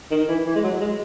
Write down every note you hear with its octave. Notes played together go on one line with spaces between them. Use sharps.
D#3
E3
E3
G#3
F#3
G#3